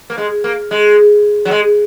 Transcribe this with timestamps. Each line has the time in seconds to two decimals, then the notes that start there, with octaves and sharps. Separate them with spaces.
0.10 A#3
0.18 G#3
0.44 A#3
0.71 G#3
1.45 F#3
1.51 G#3